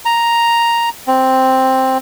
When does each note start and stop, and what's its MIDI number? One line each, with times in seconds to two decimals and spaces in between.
0.05 0.89 82
1.07 1.98 60